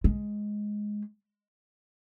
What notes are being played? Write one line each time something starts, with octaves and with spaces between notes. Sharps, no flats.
G#3